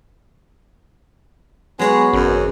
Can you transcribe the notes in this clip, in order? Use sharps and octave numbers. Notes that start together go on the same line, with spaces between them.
F#3 G#3 B3 G#4 C#5
G#1 F#2